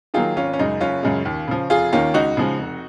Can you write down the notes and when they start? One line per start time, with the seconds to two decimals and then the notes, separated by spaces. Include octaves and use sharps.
0.14 D#3 F#3 A#3 F4 G#4
0.36 G#1 C#4 F4
0.53 C#4
0.59 F#2 C#3 G#3 D#4
0.80 F#1 C#4 F4
1.03 F#2 C#3 G#3
1.25 D#2
1.48 C#3 F3
1.70 F1 F4 G#4
1.92 D#2 D#3 A#3 C#4 F4
2.14 C#2 D#4 F#4
2.37 C#3 F3 G#3
2.59 F1